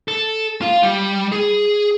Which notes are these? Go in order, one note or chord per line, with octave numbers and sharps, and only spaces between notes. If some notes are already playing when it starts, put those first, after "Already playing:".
A4
F4 F5
G3
G#4